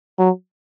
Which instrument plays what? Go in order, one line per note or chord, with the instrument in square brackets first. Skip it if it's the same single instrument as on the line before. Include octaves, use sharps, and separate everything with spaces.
[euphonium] F#3